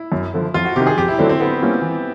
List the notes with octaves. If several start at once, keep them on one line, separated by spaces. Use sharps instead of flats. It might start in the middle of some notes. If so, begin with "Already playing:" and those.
Already playing: E4
F#2
D3 F3
F2 F4
F#4
C3 D#3 G4
G#4
F2 G4
E4
D3 F#3 A3 C4 D4
C4
D3 B3
G3 A#3 C#4 E4
E3